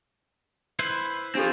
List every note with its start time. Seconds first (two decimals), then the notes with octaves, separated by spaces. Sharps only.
0.79 E4 B4 C5
1.35 C4 D4 F4 G4 A4